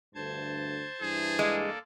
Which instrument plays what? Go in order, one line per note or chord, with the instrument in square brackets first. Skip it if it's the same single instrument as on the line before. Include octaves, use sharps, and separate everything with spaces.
[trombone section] D2 G2 D3 [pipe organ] C5 A5 G#6
[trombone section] G2 E3 E4 [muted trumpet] G#4
[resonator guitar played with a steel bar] G#3 [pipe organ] A#3 A4 D5